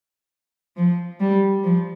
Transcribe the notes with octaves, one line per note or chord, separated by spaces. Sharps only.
F3
G3
F3